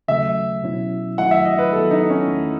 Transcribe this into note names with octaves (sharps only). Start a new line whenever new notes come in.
D#2 C#3 F#3 A3 E5
B2 F#3 C#4 E4
F#2 D#3 F#3 A3 E4 F#5
E5
D#5
B4
D#3 F#3 B3 E4 A4
D#4
C#4
E2 D#3 A3 E4